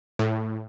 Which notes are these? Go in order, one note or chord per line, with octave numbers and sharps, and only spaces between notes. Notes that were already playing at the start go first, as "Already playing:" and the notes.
A2